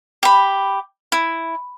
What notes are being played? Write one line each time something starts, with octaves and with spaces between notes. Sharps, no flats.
G4 B5
E4